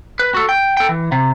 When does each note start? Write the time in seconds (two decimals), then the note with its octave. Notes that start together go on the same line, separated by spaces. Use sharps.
0.20 B4
0.34 F#4 A4
0.49 G5
0.77 A4 G5
0.89 E3
1.12 C3